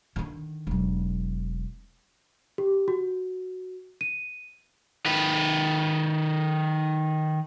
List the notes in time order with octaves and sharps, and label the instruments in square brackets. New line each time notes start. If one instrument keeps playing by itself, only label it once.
[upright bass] D3 D#3
E1 F#3
[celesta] G4
F#4
D#7
[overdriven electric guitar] D#3 B4